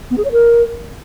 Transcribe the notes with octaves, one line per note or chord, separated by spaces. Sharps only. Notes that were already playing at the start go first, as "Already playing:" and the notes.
B3
G#4
C#5
A#4